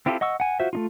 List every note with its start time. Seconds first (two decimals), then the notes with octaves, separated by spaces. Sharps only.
0.06 C4 E4 F4 G4 A4
0.21 D#5 F#5 C#6 E6
0.40 F#5 G#5
0.60 F4 F#4 C5 E5
0.73 A3 D#4 F4